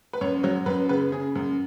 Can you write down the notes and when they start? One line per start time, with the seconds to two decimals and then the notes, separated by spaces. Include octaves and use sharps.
0.13 B4
0.21 F#2 C#5
0.43 F#3 C#5
0.66 F#2 B4
0.89 C#3 B4
1.12 C#3 G#4
1.35 F#2